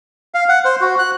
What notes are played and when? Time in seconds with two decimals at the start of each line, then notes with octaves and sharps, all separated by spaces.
0.34 F5
0.49 F#5
0.65 C5
0.81 F#4
0.99 F#6